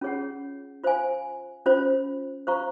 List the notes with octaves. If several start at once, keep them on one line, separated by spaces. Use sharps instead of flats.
C#4 F4 G#4 C#5 F#5
F4 C5 F5 G#5
C#4 F4 C5
F4 C5 F5 A#5 C#6